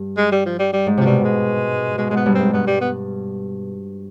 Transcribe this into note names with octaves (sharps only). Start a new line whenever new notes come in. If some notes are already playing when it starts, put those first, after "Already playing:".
Already playing: G2
G#3
G3
F3
G3
G3
G#2
C3 F3
B2 G3
G#3
B2 G#3
G#2 G#3
B3
G2
G#2 C4
G2 B3
G3
B3